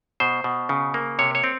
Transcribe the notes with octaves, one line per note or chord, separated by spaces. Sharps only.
B2 C5
B2
C#3
A#3
C3 C#5
C#5
C4